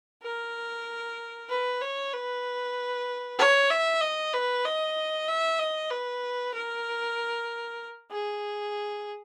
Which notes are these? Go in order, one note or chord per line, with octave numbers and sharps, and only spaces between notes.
A#4
B4
C#5
B4
C#5
E5
D#5
B4
D#5
E5
D#5
B4
A#4
G#4